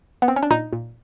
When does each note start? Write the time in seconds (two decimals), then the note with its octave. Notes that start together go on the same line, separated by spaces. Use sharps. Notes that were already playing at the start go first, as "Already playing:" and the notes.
0.22 B3
0.28 C4
0.36 C#4
0.43 D4
0.51 A#2 D#4
0.73 A#2